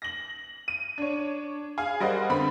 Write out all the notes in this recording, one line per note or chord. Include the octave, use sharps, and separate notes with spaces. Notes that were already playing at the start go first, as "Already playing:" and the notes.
A#6 F#7
D#7
D4 C#5
G#4 F5
G3 A#4 C5 D#5 F#5
D3 B3 C4 B5